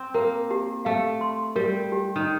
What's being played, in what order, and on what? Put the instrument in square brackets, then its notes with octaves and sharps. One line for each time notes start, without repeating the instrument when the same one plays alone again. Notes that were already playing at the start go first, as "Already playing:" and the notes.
Already playing: [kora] C4
[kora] A#3 [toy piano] A#4
[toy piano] G4
[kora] A3 [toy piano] F5
[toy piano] C6
[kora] G3 [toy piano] A#4
[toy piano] G4
[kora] D#3